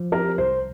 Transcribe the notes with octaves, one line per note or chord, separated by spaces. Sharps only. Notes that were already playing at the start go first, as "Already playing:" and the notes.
Already playing: F3
C4 G4 A#4
C2 C5